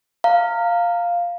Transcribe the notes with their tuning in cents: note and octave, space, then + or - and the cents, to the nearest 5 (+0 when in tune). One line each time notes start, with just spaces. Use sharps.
F5 +0 A#5 -25